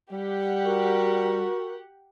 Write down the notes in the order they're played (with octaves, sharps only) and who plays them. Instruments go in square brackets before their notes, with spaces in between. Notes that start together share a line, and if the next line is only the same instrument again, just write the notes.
[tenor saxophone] G3 [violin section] G4 F#5
[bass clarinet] F#4 [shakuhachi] A#4